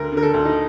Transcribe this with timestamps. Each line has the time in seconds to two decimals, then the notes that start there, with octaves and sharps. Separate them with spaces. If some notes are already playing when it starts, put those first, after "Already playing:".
Already playing: D2 A#4
0.12 D3
0.17 A#4
0.23 A4
0.34 D2
0.45 D#4